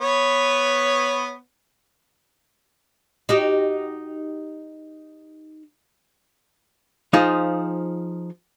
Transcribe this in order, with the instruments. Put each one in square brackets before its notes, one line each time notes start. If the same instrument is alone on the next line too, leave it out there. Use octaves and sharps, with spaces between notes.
[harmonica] B3 B4 C#5
[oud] D#4 F#4 G4
[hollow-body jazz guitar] F3 D#4 F4 G#4 C5